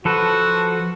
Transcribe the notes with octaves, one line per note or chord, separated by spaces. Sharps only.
F3 F#4 A4 B4